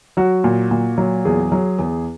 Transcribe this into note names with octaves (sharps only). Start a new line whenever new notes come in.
F#3 F#4
A#2
A#2
F#3
E2 G#4
F#3
E2